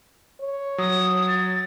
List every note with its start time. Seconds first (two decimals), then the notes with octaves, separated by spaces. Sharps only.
0.41 C#5
0.78 F#3 D#6
1.28 A6